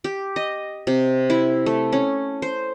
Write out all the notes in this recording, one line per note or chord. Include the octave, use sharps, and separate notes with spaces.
G4
D#5
C3
E4
A3
C#4
C5